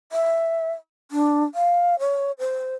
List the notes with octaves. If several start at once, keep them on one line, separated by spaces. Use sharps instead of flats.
E5
D4
F5
C#5
C5